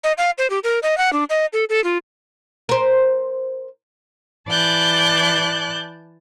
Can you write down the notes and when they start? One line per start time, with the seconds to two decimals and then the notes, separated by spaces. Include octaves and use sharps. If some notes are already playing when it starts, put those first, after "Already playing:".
0.04 D#5
0.18 F5
0.38 C5
0.50 G4
0.64 A#4
0.83 D#5
0.97 F#5
1.13 D4
1.30 D#5
1.53 A4
1.69 A4
1.84 F4
2.69 A#4 C5
4.49 E3 D5 A5 F#6 G6